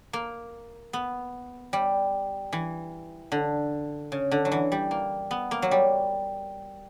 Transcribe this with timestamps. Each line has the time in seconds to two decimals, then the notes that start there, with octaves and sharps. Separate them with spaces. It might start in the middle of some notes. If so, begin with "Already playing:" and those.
0.13 A#3
0.93 B3
1.73 G3
2.53 E3
3.32 D3
4.12 C#3
4.31 D3
4.45 F#3
4.52 E3
4.72 G3
4.91 A#3
5.31 B3
5.51 A#3
5.62 F#3
5.71 G3